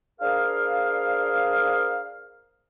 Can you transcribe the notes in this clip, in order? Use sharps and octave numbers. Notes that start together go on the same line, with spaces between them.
D4 G#4 A#4 C5 F5